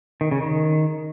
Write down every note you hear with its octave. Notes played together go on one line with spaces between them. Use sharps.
D#3
C#3
D#3